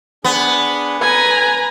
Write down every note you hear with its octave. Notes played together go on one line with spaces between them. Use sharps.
B3 D4 G#4 D#6
A4 B4 G#5 A#5